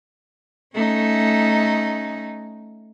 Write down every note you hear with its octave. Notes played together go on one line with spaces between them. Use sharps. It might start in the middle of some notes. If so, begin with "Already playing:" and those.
A3 C#4 D#4